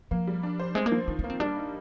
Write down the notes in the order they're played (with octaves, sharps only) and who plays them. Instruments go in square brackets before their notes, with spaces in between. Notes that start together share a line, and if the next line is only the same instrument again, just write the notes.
[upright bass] F3 [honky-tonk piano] A#3
[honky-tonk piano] G3
D4
C5
[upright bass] G#3 [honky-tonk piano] C4
[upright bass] A#3
[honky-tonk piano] F3
[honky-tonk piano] D#3 [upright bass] D4
[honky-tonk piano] A#3 [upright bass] D4
[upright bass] C4
[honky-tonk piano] G3 [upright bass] D4
[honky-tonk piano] D#4